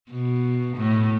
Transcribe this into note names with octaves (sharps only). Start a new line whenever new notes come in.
B2
A2